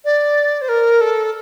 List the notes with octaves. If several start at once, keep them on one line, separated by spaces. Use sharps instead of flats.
D5
C5
A#4
A4